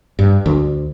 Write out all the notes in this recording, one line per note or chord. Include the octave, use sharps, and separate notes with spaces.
G2
D2